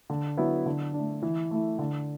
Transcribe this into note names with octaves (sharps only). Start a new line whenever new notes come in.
D3
F#3 B3 E4
D3
D4
A3
E3
A3 E4
D3